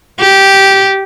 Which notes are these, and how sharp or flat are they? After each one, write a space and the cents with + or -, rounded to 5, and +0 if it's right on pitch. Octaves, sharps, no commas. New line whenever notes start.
G4 -10